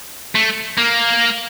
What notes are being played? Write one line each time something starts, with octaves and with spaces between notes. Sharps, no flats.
A3
A#3